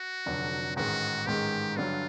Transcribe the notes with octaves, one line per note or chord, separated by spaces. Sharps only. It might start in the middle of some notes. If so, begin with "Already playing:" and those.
Already playing: F#4
F1 F2 D3 F#3
A1 G#2 D#3 G#3 F#4
A1 G#2 D#3 G#3 G4
G2 D3 F#3 F4